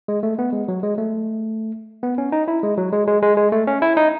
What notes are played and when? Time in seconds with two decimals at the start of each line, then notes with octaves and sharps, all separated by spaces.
0.08 G#3
0.23 A3
0.39 B3
0.53 G#3
0.68 F#3
0.83 G#3
0.98 A3
2.03 B3
2.18 C#4
2.32 D#4
2.48 E4
2.63 G#3
2.77 F#3
2.93 G#3
3.07 G#3
3.22 G#3
3.37 G#3
3.52 A3
3.67 C#4
3.82 E4
3.97 D#4